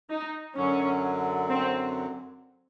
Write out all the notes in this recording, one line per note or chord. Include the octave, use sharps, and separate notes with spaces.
D#4
F#2 D3 F#3 C#4
C4